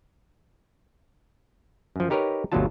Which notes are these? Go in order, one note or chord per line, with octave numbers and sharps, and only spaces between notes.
F#2 F3
D#4 G4 A#4 B4 C#5
G1 D2 B2 F#3 F4 A5